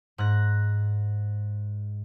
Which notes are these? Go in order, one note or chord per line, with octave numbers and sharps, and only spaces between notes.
G#2 F#6 A#6